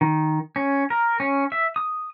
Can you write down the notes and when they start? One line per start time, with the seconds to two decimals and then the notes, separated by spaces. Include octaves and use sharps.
0.01 D#3
0.56 C#4
0.90 A#4
1.20 C#4
1.52 E5
1.76 D#6